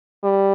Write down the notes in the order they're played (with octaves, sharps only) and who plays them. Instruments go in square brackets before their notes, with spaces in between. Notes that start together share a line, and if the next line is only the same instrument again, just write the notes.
[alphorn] G3